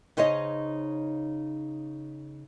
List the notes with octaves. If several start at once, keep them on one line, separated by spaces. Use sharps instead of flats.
C#3 D#4 C5 C#5 D#5